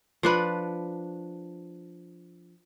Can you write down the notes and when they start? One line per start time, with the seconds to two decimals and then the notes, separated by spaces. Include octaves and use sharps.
0.23 F3 D4 B4